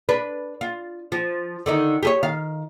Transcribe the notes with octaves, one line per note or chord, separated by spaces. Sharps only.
D4 B4
F4
F3
D3 D#3 D#4
G4 G#4 C#5
D#3 F5